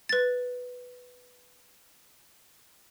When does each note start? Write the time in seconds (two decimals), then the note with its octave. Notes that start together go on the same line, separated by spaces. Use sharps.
0.09 B4 A6